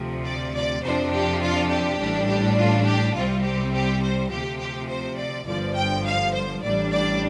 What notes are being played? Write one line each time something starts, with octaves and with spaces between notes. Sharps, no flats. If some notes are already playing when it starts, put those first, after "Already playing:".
Already playing: D2 C3 F3
D5
D5
F2 C3 F3 D4 C5
G4
F4
G4
A1 A2 G3 D4
G4
F4
G4
C2 C3 G3 C4 F4
G4
G4
C5
D2 C3 F3 G4
G4
C5
D5
G1 G2 D3 F3 D5
G5
F5
C5
A1 A2 G3 D4 D5
D5